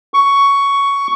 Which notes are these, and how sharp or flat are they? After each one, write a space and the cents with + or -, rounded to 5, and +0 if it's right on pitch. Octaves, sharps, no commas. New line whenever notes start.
C#6 +10